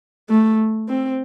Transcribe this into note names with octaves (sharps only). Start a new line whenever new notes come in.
A3
C4